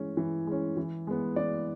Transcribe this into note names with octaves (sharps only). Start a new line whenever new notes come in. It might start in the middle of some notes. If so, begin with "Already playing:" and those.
Already playing: E3 G#3 C#4
E3
G#3 C#4
E3
G#3 B3
E3 D5